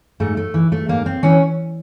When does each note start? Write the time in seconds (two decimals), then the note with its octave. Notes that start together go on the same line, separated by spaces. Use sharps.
0.20 G#2 A3
0.37 A3
0.54 E3
0.72 A3
0.89 G#2 A#3
1.06 C4
1.23 E3 C#4